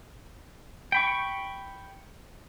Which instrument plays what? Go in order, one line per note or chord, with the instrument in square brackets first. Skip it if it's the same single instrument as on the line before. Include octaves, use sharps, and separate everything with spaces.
[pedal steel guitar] G5 B5 C#6